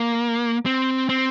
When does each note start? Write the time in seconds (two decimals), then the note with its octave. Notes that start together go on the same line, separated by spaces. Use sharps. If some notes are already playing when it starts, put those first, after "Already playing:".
Already playing: A#3
0.65 C4
1.09 C4